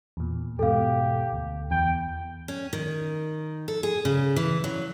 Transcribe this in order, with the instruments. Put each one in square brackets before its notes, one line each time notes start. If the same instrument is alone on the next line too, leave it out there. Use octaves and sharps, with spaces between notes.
[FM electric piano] E2 A#2
[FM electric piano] E2 G#2 B2 [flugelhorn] G4 [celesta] A4 F5
[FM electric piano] D2
[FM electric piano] E2 [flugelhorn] G5
[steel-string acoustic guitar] C#4
D#3
A4
G#4
C#3
E3
F#3